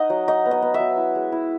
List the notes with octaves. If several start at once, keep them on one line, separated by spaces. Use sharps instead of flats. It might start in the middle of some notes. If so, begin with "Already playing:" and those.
Already playing: D#4 D#5 F#5
F#3
D#4 D#5
B3
D#5
B3
E5
F#3
E4
G#3
E4